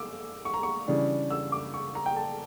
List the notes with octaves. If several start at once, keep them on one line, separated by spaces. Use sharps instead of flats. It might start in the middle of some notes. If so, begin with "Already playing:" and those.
Already playing: D6 E6
C#6
A#5
C#6
C#3 E3 G3 D4
E6
D6
C#6
A#5
G5
A5